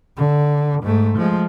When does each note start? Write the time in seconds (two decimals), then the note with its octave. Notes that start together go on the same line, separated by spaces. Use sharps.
0.17 D3
0.83 G#2 A3
1.18 F3 G#3